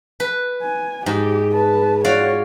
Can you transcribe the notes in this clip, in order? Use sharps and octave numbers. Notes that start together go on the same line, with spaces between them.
B4
G#5
G#2 G4
B4 A5
F4 F#4 C#5 D5 F5